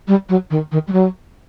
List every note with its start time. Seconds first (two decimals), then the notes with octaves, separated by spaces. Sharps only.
0.08 G3
0.29 F#3
0.51 D#3
0.72 D#3
0.88 G3
0.92 F#3